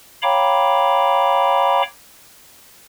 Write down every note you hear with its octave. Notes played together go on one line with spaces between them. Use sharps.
C#5 F5 G5 A#5 B5 D6